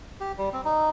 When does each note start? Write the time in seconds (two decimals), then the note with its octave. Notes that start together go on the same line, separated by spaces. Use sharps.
0.20 G4
0.38 G3
0.53 C4
0.65 D#4